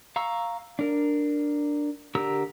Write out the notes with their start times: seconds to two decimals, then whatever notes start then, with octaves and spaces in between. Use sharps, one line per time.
0.16 F5 A#5 C#6 E6
0.79 D4 A#4
2.15 D3 G4 A#4 A#5 E6